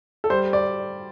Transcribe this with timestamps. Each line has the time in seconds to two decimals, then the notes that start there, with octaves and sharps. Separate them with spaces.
0.24 A4
0.30 G3 C5
0.53 D5